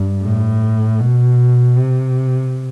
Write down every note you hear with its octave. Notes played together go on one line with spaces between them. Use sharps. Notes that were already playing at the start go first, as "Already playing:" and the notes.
Already playing: G2
A2
B2
C3